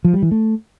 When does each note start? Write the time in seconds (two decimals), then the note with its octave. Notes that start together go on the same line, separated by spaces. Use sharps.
0.05 F3
0.14 G3
0.22 E3
0.31 A3